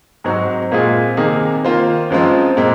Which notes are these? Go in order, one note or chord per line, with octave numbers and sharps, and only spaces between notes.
G#2 F#3 C4 D#4 F#4
A#2 G#3 C4 F4 G#4
C3 D#3 A#3 D#4 G#4
D#3 A#3 F4 C5
F#2 F3 G#3 C4 F4
A#2 G#3 C4